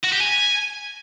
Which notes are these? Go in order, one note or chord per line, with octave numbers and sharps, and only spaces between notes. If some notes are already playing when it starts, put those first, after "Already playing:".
F#4
G4
G#5